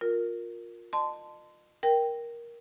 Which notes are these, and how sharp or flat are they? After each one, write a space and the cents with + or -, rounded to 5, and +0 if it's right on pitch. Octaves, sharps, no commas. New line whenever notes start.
F4 +20 A#4 +0
D#5 -35 A5 +0 C6 -20
A#4 +15 G5 +0